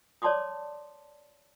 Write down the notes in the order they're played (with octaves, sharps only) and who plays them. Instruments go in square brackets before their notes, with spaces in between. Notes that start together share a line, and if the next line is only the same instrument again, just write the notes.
[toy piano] C#5 D5 A5 C6 D6 D#6